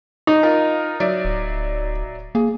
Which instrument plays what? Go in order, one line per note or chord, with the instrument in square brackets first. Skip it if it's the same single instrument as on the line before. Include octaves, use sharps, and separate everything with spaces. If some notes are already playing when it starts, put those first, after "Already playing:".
[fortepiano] D#4
[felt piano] F4 A#4
F#3 D5 E5
[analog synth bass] D1
[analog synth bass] A#3 [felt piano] G#4